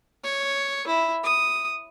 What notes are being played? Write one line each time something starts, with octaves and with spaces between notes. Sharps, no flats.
C#5
E4
D#6